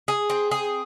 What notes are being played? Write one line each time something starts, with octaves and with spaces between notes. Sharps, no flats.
G#4
C4
G#4